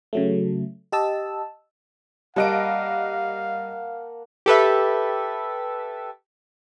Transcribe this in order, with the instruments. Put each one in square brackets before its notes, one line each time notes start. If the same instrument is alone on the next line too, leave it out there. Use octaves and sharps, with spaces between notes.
[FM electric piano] C#3 F#3 A3
G4 D#5 A5 E6
[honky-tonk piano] G3 D#5 D7 [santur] A#3 F#5 A5 [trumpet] F5
[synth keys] G4 A4 B4 E5